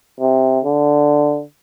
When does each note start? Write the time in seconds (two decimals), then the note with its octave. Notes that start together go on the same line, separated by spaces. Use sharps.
0.20 C3
0.64 D3